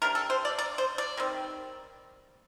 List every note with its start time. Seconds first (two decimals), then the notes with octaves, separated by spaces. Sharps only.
0.02 C3 G3 D4 A#4
0.15 A4
0.30 C5
0.45 D5
0.59 D5
0.78 C5
0.98 D5
1.17 D#3 G3 C4